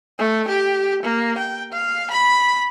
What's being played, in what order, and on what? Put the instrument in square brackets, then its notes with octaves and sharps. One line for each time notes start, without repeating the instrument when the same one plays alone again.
[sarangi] A3
G4
A#3
G5
F5
B5